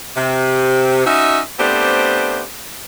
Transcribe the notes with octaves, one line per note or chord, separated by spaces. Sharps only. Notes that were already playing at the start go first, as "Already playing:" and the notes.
C3
C#4 D#4 F#4 D#5 E5
A3 B3 C4 D4 G4 C5